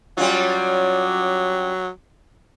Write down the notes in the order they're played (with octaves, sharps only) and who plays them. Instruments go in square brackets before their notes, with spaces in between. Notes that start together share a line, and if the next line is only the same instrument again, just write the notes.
[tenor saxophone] F#3 [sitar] G3 C#4 F4